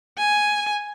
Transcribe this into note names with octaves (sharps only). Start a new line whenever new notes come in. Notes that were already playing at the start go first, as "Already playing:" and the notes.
G#5